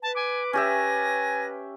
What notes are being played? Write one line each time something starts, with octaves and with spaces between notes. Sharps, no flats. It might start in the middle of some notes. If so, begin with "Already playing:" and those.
B4 A5
G#5 D6
C#4 G4 E5 G#5 A#6